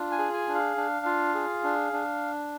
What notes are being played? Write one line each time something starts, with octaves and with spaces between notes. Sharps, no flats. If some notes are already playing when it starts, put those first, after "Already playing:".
Already playing: D4 F4
G#5
G#4
G#5
D4
F5
D4
F4
G#4
D4
D4